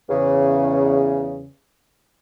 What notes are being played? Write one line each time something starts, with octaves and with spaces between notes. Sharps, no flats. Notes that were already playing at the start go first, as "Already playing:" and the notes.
E2 C#3